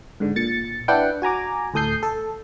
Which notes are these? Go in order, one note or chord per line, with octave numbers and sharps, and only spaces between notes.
G#2 D3
A#2 A6 C#7
D4 E4 B4 F#5 G5
F#4 G#5 A#5 D6
D2 A2 A4 D#6 G6 C7
A4